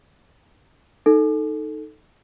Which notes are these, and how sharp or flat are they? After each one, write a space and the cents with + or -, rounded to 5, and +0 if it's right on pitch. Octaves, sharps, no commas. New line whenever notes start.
D#4 +0 A4 +0